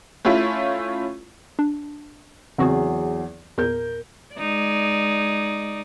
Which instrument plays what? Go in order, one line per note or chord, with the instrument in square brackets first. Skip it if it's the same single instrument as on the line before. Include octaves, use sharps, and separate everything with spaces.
[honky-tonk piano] A3 C#4 E4 F4
[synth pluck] D4
[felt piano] E2 F#3 G#4 [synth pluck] C#3 C4 F#4
[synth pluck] E2 A#2 [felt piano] A#4 G6
[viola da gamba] G#3 D#4 D5